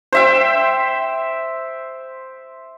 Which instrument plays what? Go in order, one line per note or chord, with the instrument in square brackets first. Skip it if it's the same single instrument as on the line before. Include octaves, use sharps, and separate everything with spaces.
[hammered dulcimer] C5 E5 G5